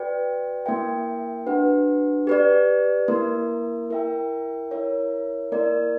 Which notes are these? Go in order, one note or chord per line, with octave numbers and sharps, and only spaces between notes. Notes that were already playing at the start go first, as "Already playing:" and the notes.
Already playing: F#4 B4 D5 G5
A#3 E4 A#4 E5 G5
D4 F#4 B4 F#5
G4 B4 D5
A#3 E4 A#4
E4 A#4 E5 G5
E4 A#4 C#5 E5
A#3 E4 A#4 D5